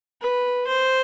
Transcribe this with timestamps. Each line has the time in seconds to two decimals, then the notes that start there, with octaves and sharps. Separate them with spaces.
0.22 B4
0.67 C5